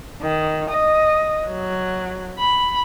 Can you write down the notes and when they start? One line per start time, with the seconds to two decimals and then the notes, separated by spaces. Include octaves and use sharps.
0.22 D#3
0.70 D#5
1.48 F#3
2.39 B5